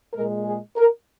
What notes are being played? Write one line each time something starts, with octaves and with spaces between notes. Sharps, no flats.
A#2 G#3 A#4
G#4
A#4